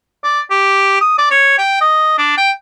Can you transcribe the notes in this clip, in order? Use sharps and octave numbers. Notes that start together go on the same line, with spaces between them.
D5
G4
D#6
D5
C#5
G5
D#5
D4
G5